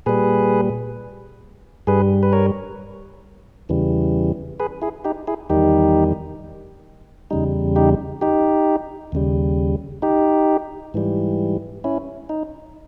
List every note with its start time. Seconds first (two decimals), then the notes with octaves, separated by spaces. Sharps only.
0.06 A#2 G3 G#4 B4
1.87 G2 G3 G#4 B4
2.23 B4
2.33 A#4 C#5
3.69 E2 C#3 E3 G3
4.60 G#4 B4
4.82 E4 G#4
5.05 D#4 G4
5.27 E4 G#4
5.50 E2 D#3 G3 D#4 G4
7.31 E2 C#3 G3 D#4
7.76 D#4 G4
8.21 D#4 G4
9.12 D#2 C#3 G3
10.02 D#4 G4
10.94 G#2 E3 G3
11.84 C#4 E4
12.29 D#4